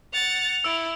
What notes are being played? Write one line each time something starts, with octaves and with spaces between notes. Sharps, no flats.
F#5 A6 F7
E4 E6 D7